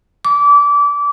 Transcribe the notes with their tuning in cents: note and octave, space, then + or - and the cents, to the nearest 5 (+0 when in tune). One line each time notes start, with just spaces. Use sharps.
D6 -25